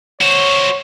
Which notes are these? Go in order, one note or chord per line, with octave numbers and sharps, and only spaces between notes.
F#4 C5 C#5